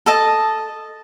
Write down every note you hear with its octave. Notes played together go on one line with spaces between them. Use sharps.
A4 D#5 A5